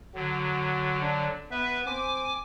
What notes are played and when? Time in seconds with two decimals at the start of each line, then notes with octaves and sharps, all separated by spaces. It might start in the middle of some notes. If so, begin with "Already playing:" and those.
0.15 D3 F#3 F#4
1.02 D4
1.51 B3 B4 E5
1.86 C4 G#5 D6